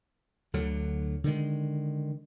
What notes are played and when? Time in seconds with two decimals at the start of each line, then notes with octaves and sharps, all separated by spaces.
0.54 D2 D3 F#3
1.24 D3 D#3 G#3